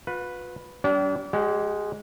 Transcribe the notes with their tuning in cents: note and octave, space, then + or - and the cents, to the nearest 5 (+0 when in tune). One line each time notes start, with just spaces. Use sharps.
F4 +45 B4 +0
G3 -40 D4 -40 G4 -25
G#3 +0 G4 -40 F#5 +20